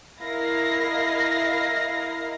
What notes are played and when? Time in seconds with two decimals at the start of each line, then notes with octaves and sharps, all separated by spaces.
0.20 E4 A#4 D#5 F5 A#6 C7